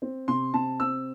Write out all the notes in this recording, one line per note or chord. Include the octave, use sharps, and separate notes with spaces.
C4
C3 C6
C3 A5
C4 E6